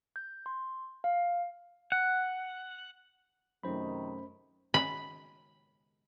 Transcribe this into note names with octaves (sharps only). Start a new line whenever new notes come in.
G6
C6
F5
F#5
F#2 C3 D#3 A3 C#4 D#4 C5 B5
B5